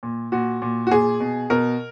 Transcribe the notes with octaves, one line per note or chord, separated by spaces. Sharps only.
A#2
A#2 F#4
A#2
F#4
A#2 G#4
B2
B2 A#4